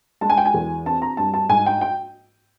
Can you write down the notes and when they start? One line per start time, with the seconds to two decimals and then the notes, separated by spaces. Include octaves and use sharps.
0.21 G#3 A5
0.30 G#5
0.37 G5
0.45 G#5
0.54 E2
0.86 C4 A5
1.02 A#5
1.17 G2 A5
1.34 A5
1.49 G#2 G#5
1.66 G5
1.81 G5